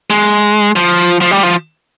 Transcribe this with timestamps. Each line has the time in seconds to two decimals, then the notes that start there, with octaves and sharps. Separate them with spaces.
0.10 G#3
0.76 F3
1.21 F3
1.31 G3
1.43 F3